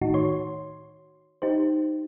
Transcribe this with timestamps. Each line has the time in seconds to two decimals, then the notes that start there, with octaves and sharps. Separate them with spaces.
0.01 A2 D#3 D#4 F#4
0.14 C#5 C6
1.42 D#4 G4 C5